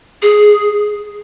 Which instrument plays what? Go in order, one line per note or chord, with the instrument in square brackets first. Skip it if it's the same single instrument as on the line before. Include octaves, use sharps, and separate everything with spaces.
[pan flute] G#4